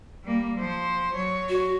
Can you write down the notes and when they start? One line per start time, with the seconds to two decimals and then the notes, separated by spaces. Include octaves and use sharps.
0.24 G3 A#3
0.58 F3 C5
1.14 F#3 C#5
1.49 F#4